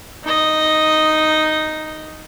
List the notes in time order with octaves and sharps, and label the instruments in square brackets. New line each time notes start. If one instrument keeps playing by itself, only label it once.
[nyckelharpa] D#4 D#5